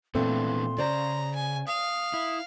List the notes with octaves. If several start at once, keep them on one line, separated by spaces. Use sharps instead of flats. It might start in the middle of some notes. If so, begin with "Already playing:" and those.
A#2 E3 A3 B3 C4 D4 C6
C#3 C5 D5 A#5
G#5
F5 D#6
E4